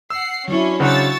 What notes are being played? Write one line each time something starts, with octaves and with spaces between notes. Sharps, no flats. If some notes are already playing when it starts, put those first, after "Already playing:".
F#5 E6 C7
F#3 C#4 D4 E4 C#5
C#3 F#3 D4 C5 C#5 F#5 E6 A6